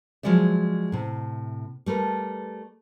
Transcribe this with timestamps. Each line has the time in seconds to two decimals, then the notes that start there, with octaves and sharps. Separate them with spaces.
0.23 F3 F#3 G#3 D5 E5
0.92 A2 C3
1.86 G3 A3 A#4 B4